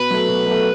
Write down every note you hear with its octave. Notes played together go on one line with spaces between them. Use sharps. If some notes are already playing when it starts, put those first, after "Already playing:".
Already playing: B2 B4
F#3 A3
B2
F#3 A3